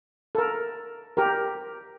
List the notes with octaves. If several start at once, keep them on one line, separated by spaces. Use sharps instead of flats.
A4 A#4
G4 A#4